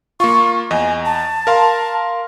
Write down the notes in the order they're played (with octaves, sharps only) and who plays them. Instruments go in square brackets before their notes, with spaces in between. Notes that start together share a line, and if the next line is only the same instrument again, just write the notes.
[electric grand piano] A#3 F4 [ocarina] C#6
[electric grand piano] E2 D#5 [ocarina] G#5
[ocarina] A5
[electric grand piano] A#4 F5 C6